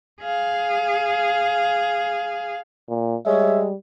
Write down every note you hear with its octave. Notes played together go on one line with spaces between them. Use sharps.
G#4 F5
A#2
G3 G#3 C#5 E5